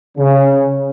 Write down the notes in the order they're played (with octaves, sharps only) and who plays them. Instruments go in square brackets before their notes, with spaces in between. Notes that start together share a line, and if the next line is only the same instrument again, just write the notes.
[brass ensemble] C#3